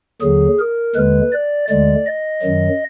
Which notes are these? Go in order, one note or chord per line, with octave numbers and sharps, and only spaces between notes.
D#2 D3 F#3 G#4
A#4
D#2 D3 G#3 B4
D5
D2 D3 G#3 D5
D#5
F#2 D#3 F#3